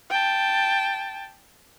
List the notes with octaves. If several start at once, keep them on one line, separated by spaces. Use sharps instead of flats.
G5 A5